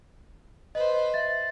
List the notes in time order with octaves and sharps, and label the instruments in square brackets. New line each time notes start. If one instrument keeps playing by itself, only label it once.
[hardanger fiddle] B4 C5 [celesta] D#5
[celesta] E5 A6